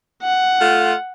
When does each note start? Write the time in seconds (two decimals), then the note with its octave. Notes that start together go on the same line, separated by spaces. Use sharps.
0.23 F#5
0.61 A3 F4